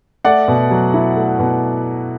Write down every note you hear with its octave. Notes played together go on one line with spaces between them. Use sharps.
A3 D5 F#5
B2
F#3
E4
A3
B2